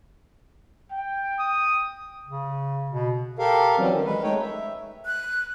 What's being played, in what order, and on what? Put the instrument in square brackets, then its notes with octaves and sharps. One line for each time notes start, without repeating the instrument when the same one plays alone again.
[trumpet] G5
[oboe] D#6
[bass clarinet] C#3
B2
[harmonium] G4 A4 A#4 F5
E3 F#3 G3 C4 C#4
D#3
G#3 B4
G#3 A3 D#4 C#5 G5
E5
[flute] F#6